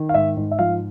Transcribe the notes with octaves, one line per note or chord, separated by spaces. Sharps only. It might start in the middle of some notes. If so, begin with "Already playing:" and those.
Already playing: D#3
F5
G#2 E5
G#2
E5
F3 F5